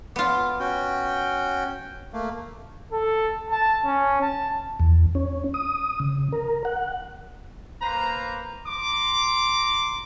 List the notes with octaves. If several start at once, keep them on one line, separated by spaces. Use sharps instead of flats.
B3 F4 D6
C#4 F#4 G5
A3 A#3
A4
A5
C#4
A5
E2
C#4
D#6
C#3
A#4
F#5
A#3 B4 C5 A#5
A#5 C6 D6